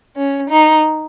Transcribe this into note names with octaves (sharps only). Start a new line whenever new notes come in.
C#4
D#4